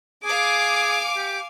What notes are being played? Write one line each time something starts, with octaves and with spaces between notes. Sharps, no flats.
G#4 F5 G#5 D6
G4